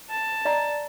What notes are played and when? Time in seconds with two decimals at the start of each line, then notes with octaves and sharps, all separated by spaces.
0.10 A5
0.45 D5 D#5 A#5